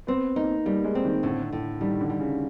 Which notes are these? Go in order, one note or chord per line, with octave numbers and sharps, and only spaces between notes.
B3 C4
A#3 D#4
G3 A#3
G#3
C4
D#3
A2 D3
A2
D#3 G3
D3
G3
C#3